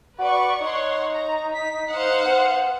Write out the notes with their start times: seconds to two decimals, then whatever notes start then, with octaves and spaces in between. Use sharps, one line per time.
0.19 F#4 B4 D5 C#6
0.61 D#4 C#5 F#5 C6
1.12 A#5
1.55 B6
1.90 C5 F5 F#5
2.25 B3